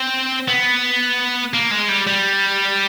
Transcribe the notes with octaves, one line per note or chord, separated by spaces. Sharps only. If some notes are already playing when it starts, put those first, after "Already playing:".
Already playing: C4
B3
A#3
G#3
G3
G3